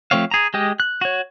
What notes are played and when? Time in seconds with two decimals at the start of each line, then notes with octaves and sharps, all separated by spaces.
0.11 F3 A3 C4 C#5 F5
0.31 G#4 A#5
0.54 G#3 G4 D#5
0.80 F#6
1.01 F#4 C#5